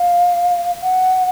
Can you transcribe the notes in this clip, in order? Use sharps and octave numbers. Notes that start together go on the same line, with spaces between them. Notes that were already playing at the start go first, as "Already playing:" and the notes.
Already playing: F5
F#5